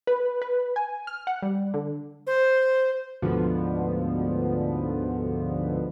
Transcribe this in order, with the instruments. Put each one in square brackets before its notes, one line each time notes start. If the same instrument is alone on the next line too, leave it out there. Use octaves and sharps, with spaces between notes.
[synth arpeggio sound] B4
B4
G#5
F6
F#5
G3
D3
[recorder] C5
[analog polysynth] D2 G#2 B2 D3 F3 B3